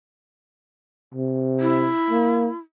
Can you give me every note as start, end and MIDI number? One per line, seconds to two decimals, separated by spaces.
1.14 1.91 48
1.60 2.58 64
2.10 2.50 58